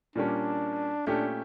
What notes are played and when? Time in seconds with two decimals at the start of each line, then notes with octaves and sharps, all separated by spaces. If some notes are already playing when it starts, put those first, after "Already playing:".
0.15 A#2 G3 A#3 C#4 D4
1.07 A#2 A3 C#4 D4 G4